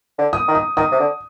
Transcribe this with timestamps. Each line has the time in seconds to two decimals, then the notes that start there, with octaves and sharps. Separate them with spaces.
0.19 D3
0.33 D#6
0.48 D#3
0.55 D#6
0.77 D#3 D#6
0.92 C3
1.00 D3